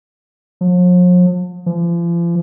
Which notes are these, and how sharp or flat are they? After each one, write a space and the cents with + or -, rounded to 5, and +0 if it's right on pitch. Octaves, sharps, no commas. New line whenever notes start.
F3 +45
F3 -40